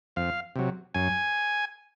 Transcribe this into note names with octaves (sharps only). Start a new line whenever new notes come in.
F2 F5
C3 F#3
F#2 G#5